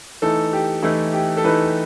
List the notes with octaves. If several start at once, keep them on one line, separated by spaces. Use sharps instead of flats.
E3 A3 D#4 A4
G4
E3 A3 D#4 E4
G4
A4
E3 A3 D#4 B4